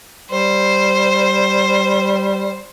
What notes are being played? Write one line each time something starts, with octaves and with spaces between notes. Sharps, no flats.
G3 C5